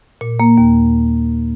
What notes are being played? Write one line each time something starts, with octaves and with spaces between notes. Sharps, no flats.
A#2
A#3
D#2